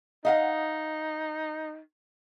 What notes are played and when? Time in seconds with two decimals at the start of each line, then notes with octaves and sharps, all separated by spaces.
0.25 D#4 D#5 F5 F#5